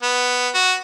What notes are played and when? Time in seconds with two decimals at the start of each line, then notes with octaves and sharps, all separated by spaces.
0.03 B3
0.54 F#4